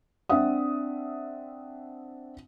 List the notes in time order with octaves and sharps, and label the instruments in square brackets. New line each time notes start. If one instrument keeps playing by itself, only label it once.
[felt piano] C4 D4 E5 F#5 D#6